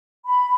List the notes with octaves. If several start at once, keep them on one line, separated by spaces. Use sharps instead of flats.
B5